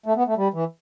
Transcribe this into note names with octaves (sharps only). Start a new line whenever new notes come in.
A3
B3
A3
G3
E3